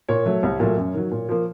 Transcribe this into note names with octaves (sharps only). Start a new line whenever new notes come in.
A#2 C#5
F#3 A3
C2
A#2 F#3 A3
F#2
D#3 F#3
A#2
F3 A#3